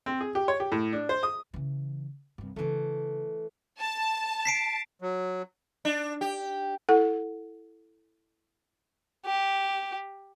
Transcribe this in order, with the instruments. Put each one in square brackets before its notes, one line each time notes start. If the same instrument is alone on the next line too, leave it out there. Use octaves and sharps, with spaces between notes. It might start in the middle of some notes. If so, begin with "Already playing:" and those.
[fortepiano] C4
G#4
G4
C#5
G4
A2
D4
C5
D#6
[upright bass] C#3 E3
C2 G2
[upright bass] C#3 D4 [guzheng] E3 A3
[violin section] A5
[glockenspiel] B6 C7 D7
[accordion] F#3
[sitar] D4
G4
[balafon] E4 A4 F#5
[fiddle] G4